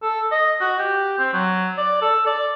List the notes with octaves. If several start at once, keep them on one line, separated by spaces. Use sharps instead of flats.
A4
D#5
F#4
G4
C4
F#3
D5
A4
D5